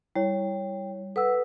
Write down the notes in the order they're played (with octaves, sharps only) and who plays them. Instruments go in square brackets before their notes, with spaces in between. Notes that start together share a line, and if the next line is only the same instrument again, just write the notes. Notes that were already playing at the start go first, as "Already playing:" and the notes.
[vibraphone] G3 [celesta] E4 C#5
[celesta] A4 F#5 E6 [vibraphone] B4